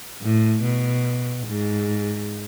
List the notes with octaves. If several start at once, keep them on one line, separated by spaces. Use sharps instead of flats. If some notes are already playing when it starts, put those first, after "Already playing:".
A2
B2
G#2